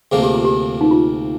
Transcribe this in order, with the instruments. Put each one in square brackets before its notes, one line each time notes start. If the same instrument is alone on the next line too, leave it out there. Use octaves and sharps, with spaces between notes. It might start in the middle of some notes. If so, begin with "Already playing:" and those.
[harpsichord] D2 C3 F3 A#3 [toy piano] G#4
[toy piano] G4
F4
G4
D#4
F4